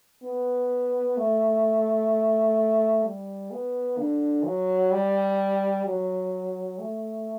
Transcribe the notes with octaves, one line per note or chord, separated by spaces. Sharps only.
B3
A3
G3
B3
D3
F#3
G3
F#3
A3